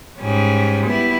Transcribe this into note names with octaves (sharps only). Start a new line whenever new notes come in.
G#2 G3 C#4
G3 B3 E4